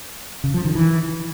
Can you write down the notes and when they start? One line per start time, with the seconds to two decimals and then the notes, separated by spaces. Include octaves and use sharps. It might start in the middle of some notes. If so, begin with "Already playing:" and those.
0.44 C#3
0.54 F3
0.65 D#3
0.75 E3